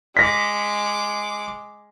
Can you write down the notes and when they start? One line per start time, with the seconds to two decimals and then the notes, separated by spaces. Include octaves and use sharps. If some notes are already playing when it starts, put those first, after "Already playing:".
0.17 G#3 D6 A#6 B6